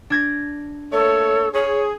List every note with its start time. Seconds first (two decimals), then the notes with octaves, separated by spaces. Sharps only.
0.10 D4 G#6 A#6
0.92 A3 A#3 A4 C#5
1.53 G#4 C#5